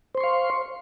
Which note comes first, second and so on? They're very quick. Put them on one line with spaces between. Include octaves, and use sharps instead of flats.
C5 C6 C#6 F5